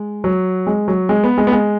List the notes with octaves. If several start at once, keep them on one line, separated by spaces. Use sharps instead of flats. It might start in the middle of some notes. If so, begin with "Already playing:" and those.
Already playing: G#3
F#3
G#3
F#3
G#3
B3
G#3
B3
G#3